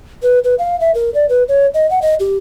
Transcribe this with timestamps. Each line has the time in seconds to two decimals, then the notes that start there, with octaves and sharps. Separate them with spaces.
0.23 B4
0.44 B4
0.59 F5
0.80 E5
0.95 A#4
1.14 D5
1.29 B4
1.48 C#5
1.74 D#5
1.91 F#5
2.02 D#5
2.20 G4